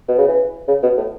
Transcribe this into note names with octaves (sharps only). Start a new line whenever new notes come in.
B2
C#3
E3
C#3
B2
A2